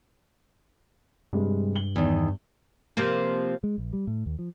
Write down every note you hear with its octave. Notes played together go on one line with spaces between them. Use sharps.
G2 C3 G3 G#3
F#7 G7
E2 D#3
C3 F3 A#3
G#3
A#1
G3
A2
D#2
F3